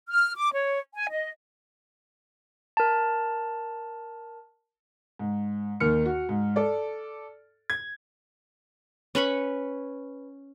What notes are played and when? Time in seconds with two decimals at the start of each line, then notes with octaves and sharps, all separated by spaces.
0.08 F6
0.36 D6
0.52 C#5
0.95 G#5
1.11 D#5
2.77 A#4 A5
5.19 G#2
5.80 D#2 D#3 F6 C#7
6.05 F#4
6.29 G#2
6.56 A4 D5
7.70 G#6
9.15 C#4 B4 B5 C#6